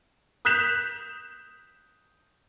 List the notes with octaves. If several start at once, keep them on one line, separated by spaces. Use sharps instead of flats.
D#6 F#6 G6 B6 E7 F7